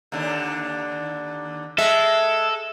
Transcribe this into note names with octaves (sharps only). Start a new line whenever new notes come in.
D#2 D3
G#3 A4 E5